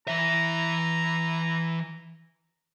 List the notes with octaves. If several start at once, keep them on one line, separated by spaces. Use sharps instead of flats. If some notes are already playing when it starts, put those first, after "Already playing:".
E3 E5 A#5